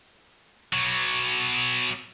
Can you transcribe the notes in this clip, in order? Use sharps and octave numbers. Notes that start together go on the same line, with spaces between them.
B2 F#3